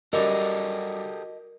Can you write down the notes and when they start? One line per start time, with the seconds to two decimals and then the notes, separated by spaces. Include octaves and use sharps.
0.13 F#2 G3 F#4 G4 A4 A#4 D#5 A#5